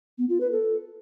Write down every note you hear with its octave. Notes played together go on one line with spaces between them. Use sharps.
B3
F4
B4
A4